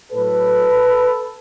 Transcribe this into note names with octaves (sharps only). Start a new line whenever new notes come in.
A2 F#3 A4 B4